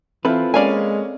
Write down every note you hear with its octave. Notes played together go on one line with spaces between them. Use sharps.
E3 C4 E4 F4 A4 B4 C5
G#3 A#3 C#4 D5 F5 G#5